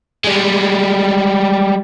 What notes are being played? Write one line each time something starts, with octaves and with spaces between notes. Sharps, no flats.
G3 G#3